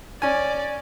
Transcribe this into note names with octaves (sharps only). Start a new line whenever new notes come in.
C#4 D5 G#5